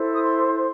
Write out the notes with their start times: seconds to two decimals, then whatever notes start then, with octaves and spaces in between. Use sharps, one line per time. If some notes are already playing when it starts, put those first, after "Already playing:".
Already playing: E4 A4 C5
0.15 D#6
0.23 C6
0.54 C6